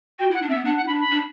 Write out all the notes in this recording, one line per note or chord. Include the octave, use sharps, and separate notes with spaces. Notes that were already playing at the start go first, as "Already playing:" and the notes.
F#4 G5
E4
F#5
D4
C4 E5
B3
D4 F#5
F#5
E4
D4 B5
B5
D4